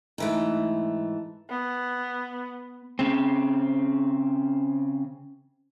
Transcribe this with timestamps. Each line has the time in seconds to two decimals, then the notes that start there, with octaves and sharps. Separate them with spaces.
0.18 G#2 E3 A3
1.49 B3
2.99 C#3 C4